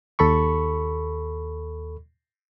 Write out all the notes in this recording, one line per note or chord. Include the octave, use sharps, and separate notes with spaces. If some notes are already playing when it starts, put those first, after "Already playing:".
D#2 A4 B5 C#6